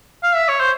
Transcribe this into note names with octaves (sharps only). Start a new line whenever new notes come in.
F5
E5
C#5
C5